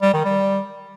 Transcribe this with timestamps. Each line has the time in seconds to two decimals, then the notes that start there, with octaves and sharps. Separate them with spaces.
0.02 G3
0.14 D#3
0.25 G3